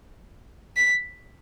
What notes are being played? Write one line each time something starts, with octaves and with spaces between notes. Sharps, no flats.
B6